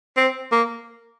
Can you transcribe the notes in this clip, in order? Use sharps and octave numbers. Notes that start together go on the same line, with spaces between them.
C4
A#3